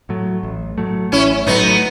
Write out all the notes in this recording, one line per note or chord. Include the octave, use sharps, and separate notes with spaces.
A2 F#3 A3
A1
A2 F#3 A3
A1 C#4 E4
A2 F#3 A3 B3 D#4